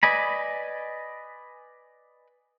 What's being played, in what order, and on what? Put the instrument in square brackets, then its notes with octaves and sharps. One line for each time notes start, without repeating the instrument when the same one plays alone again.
[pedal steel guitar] B4 D5 D#5 G#5 B5